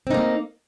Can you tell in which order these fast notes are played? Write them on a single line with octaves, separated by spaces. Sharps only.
C4 D#4 A#3